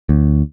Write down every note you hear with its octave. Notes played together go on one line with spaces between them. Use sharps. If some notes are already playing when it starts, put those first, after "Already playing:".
D2